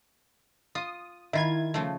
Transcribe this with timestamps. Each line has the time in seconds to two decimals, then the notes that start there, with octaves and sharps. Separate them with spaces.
0.75 F4 D#6
1.33 D#3 E4 F4 G#6
1.74 C#3 F3 A3